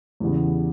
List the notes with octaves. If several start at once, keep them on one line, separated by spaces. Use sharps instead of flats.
E2 C#3 G3 B3